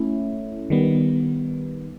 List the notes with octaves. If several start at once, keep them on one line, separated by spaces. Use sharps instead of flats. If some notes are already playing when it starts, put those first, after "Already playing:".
Already playing: A3 C#4 E4
D#3 G3 B3